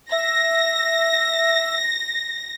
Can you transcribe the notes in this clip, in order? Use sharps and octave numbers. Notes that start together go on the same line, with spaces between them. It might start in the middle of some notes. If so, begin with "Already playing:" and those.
E5 A#6